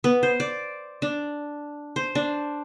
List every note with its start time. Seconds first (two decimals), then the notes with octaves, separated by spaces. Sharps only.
0.04 B3
0.23 C5
0.40 D5
1.02 D4
1.96 C5
2.15 D4